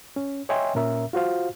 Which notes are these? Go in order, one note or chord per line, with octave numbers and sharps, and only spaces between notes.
C#4
C#5 D#5 E5 G5 G#5 C6
A#2 C#4 A#4 E5
F4 F#4 C5 F5